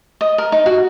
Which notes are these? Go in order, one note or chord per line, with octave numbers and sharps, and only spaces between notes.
D#5
A#4
D#4
F#4